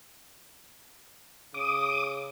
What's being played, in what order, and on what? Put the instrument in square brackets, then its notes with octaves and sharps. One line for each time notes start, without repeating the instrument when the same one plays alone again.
[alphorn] C#3 [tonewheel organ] D6 D#6